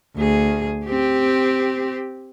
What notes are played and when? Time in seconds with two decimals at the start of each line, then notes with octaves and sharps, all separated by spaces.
0.16 D2 G#4
0.86 C4 G4